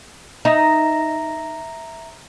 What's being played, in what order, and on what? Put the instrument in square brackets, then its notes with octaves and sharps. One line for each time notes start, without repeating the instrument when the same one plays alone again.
[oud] D#4 [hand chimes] E5 A#5 A#6